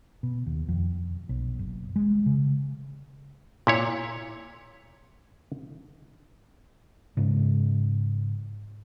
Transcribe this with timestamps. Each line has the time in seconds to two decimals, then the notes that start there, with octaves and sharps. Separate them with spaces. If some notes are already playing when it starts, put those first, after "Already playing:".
0.23 B2
0.46 D#2
0.68 F2
1.29 B1
1.59 F#1
1.96 G#3
2.26 C#3
3.67 A#2 E4 C#5
7.17 G#2 C#3